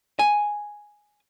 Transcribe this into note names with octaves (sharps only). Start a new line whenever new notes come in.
G#5